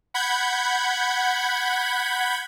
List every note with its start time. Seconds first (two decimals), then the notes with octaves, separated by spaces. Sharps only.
0.14 F#5 B5 G6 G#6